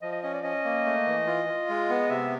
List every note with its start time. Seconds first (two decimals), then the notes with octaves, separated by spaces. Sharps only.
0.02 F3 D#5
0.12 D#5
0.23 C#4 D#5
0.33 D5
0.44 C#4 D#5
0.65 A#3
0.85 A3
1.07 E3
1.27 F4
1.48 F4
1.69 G#3
1.90 B3
2.10 C3 E5